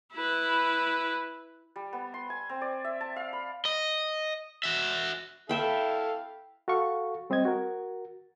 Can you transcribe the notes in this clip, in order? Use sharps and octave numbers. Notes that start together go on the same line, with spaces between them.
E4 B4
G3
B3
C6
G#5
C4
D5
E5
A5
F5
B5
D#5
F#4 E5
E4 A4 E5 F5 G5 B5
F#4 A4 F5 C#6
G3 C4 C5 D#5 G#6
F#4 A#4